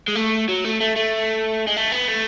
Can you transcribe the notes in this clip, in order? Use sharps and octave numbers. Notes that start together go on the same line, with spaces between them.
G#3
A3
F#3
A3
A3
A3
G#3
A3
B3
A3